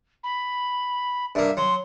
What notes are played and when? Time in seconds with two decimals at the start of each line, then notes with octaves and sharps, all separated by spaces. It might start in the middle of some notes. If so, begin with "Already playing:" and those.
0.24 B5
1.35 G2 A#3 E5
1.57 F#3 C6